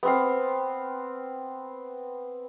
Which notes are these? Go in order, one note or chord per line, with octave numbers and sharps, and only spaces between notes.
B3 C4 F5